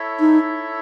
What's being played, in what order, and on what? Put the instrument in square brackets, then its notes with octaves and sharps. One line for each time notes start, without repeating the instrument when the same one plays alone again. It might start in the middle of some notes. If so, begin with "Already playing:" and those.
Already playing: [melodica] E4 A4 C#5 E5
[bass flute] D#4